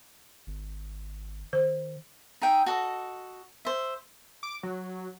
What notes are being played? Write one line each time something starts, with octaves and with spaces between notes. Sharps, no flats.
G#1
D#3 C5
D#4 G#4 E5 G5
F#4 A4 D#5
C5 E5
D6
F#3